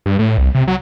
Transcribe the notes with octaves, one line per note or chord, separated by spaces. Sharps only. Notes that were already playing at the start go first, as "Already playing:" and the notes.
G2
A2
C2
C3
F#3